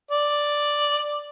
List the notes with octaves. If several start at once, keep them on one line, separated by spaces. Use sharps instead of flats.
D5